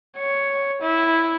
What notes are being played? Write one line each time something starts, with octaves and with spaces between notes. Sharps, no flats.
C#5
E4